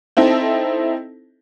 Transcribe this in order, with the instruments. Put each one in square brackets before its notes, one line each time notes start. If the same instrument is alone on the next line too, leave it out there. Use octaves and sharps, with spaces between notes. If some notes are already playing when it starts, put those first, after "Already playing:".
[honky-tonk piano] C4 D#4 E4 A4